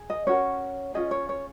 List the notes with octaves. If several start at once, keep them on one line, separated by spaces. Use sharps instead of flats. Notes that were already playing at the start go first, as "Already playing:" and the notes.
Already playing: G#4
D#5
C#4 F#4 A#4 C#5
C#4 F4 G#4 D#5
C#5
C#5